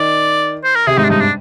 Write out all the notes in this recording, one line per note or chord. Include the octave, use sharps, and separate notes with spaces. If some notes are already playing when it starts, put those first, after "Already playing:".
Already playing: D#3 D5
C5
A#4
C3 G#4
G#2 D#4
D4
G2 D#4
D4